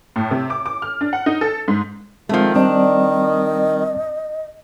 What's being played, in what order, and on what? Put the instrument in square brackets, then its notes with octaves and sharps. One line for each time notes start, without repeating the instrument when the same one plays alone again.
[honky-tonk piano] A2
C3
D6
D6
F6
D4
F#5
D#4
A4
G#2
[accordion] D#3 [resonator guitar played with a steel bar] F3 A3 [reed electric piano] G#3 C4
[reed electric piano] G3 C4 [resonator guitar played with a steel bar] D4 [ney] D#5